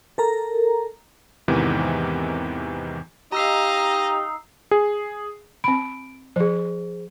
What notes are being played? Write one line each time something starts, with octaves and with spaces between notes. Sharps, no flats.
A4 A#4 A#5
E2 G#2 C3 D#3 E3
D#4 G4 D#5 F5 A#5 E6 C7
G#4
C4 B5 D7
F3 G#4 C5